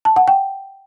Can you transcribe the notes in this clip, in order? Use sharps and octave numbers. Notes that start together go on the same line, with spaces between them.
A5
F#5
G5